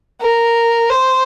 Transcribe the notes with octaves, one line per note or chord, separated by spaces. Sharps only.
A#4
C5